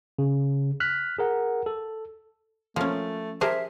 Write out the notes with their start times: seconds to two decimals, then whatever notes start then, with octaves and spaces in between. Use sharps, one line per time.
0.19 C#3
0.80 F6 F#6 B6
1.18 G#4 A#4 F#5
1.66 A4
2.76 F3 A3 A#3 C#4
3.41 G4 G#4 A#4 C5 E5 A5